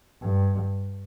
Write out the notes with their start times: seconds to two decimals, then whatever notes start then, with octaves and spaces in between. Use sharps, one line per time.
0.22 G2